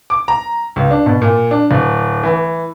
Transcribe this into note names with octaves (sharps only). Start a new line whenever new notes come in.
D6
A#5
C#2
D4
B2
A#2
D4
D1
E3